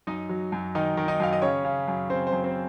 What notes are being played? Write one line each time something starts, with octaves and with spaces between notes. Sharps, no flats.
F#2 D#4 D#5
F#3
F#2
D#3 D#4 D#5
D#3
D#4 D#5
F#2 F5
D#5
C#3 C#4 C#5
C#3
F#2
C#3 C4 C5
C4 C5
F#2
C4 C5